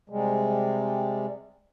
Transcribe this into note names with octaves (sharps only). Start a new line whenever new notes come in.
C3 G3 G#3